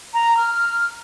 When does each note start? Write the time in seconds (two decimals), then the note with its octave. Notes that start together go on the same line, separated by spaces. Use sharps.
0.13 A#5
0.36 F6